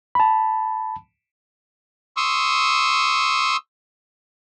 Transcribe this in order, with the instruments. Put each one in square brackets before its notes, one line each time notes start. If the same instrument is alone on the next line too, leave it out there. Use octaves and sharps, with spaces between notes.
[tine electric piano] A5 B5
[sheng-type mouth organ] C6 C#6 D#6 E6